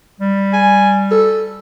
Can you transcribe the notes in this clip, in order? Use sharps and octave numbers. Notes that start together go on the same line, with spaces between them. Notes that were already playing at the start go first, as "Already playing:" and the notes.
G3
G#5
A4